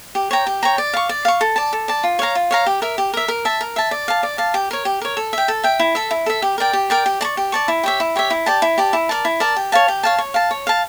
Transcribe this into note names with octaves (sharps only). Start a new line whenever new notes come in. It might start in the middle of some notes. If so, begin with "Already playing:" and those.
G4
C#5 G5 A#5
G4
C#5 G5 A#5
D5
F5 C#6
D5
F5 C#6
A4
D5 A5
A4
D5 A5
F4
C#5 F5 A#5
F4
C#5 F5 A#5
G4
A#4 E5
G4
A#4 E5
A#4
E5 A5
A#4
E5 A5
D5
F5 A5
D5
F5 A5
G4
A#4 C#5
G4
A#4 C#5
A4
E5 G5
A4
E5 G5
E4
A4 E5
E4
A4 E5
G4
A#4 D5 G5
G4
A#4 D5 G5
G4
D5 A5 C#6
G4
D5 A5 C#6
E4
G4 C#5 E5
E4
G4 C#5 E5
E4
G4 D5 A5
E4
G4 D5 A5
E4
A#4 D5 A5
E4
A#4 D5 A5
G4
C#5 F5 A5
G4
C#5 F5 A5
C#5
F5 A5
C#5
F5 A5